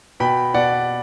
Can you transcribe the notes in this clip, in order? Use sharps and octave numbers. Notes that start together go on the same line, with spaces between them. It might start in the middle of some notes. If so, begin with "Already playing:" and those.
B2 G5 B5
B2 D5 F#5